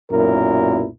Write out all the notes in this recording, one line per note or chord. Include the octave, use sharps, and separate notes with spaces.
B1 F#2 A#2 E4 A#4